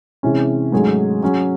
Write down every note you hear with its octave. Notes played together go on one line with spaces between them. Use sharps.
C3 E3 G#3 C#4
G#2 F#3 A3 C#4 G#4
F#3 C#4 G#4